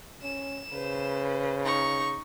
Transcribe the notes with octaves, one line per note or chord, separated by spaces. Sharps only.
C#4 E7
C#3 B4 C5
D#4 C#6